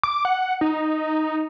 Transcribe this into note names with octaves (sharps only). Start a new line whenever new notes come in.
D6
F#5
D#4